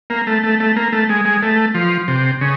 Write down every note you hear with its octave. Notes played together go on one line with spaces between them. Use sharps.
A#3
A3
A3
A3
A#3
A3
G#3
G#3
A3
F3
C3
C#3